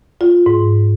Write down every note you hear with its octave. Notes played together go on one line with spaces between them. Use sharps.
F4
G#2